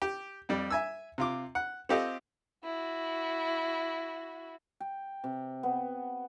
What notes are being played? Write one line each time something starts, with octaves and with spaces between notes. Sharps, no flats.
G4
F2 G3
E5 G#5 E6
C3 F4 D6
F#5
C4 F4 G4 A4 D#5 F5
E4 F#4
G5
C3
B3